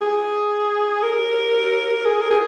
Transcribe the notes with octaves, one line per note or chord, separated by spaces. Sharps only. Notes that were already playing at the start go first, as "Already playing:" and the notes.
G#4
A#4
G#4
A#4
G#4